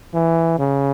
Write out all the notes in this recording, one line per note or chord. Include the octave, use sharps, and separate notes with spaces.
E3
C#3